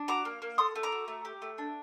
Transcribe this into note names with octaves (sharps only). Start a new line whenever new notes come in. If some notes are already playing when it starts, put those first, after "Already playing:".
Already playing: D4
F#4 A#5 D6
A#3
A#3
A4 C6 D#6
A3
A#5 D6
F#4
A3
G4
A3
D4